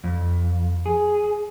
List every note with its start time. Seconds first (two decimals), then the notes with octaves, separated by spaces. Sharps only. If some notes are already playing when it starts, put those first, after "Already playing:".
0.04 F2
0.86 G#4